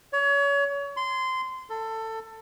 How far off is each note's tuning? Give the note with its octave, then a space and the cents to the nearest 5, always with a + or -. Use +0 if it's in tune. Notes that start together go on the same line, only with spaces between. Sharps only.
C#5 +30
C6 -20
A4 +20